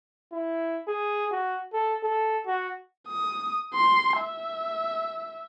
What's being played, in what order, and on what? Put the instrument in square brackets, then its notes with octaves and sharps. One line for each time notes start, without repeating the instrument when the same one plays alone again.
[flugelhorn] E4
G#4
F#4
A4
A4
F#4
[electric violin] D#6
C6
E5